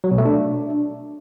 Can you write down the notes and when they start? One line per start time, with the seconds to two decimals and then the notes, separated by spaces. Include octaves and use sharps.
0.04 F#3
0.11 B2
0.18 A3
0.25 D4